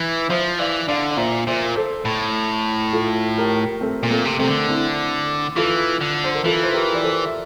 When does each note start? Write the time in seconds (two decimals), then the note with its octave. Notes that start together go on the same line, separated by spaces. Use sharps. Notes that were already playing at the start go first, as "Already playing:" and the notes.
Already playing: E3
0.29 F3 C5 E5
0.59 E3 D5 F5
0.88 D3 D5 F5
1.11 D5
1.17 A#2 C5 E5
1.47 A#2 C5 E5
1.76 A4 C5
2.05 A2
2.93 F4 A4
3.38 G4 A#4
3.81 A3 C4
4.03 A#2
4.11 A3 C4
4.25 C3
4.39 C3 A3 C4
4.47 D3
4.68 C4 E4
5.56 E3 F4 A4
6.01 D3
6.24 C5
6.35 A#4
6.44 E3 F4 A4
6.63 C5
6.74 G4 A#4
6.95 D5
7.03 A4 C5
7.26 E5